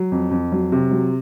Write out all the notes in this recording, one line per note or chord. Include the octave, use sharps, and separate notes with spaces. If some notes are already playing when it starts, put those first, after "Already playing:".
Already playing: F#3
F2
F2
F#3
C3
F#3